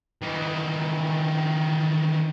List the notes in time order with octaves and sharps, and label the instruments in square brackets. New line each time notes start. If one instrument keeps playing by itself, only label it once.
[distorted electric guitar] D#3 E3